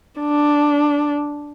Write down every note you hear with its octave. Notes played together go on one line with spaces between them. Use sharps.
D4